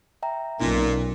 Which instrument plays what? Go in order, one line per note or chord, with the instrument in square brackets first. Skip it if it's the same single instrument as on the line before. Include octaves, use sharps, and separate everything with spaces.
[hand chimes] E5 G5 A#5
[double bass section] B1 [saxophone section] A#2 [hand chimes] C#4 D#4